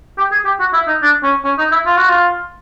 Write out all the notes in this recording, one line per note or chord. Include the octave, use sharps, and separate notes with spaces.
G4
G#4
G4
F#4
E4
D#4
D4
C#4
C#4
D#4
E4
F4
F#4
F4